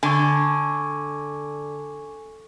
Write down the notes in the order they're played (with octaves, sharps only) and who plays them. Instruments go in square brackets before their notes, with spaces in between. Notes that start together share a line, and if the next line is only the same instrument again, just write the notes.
[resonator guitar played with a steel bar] D3 [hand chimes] G#5 C#6